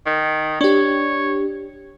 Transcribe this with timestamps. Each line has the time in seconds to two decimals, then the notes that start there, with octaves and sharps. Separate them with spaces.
0.06 D#3
0.61 D4 G4 C#5